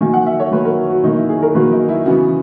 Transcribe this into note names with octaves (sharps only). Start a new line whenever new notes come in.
D#3 F#3 A#3 G#5
F#5
E5
C#5
D#3 F#3 A#3 B4
A#4
F#4
F#4
D#3 F#3 A#3 D#4
E4
G#4
A#4
D#3 F#3 A#3 B4
D#4
E4
C#3 E3 B3 F#4